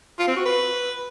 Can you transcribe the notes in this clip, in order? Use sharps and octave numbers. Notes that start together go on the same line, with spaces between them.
F4
C4
F#4
B4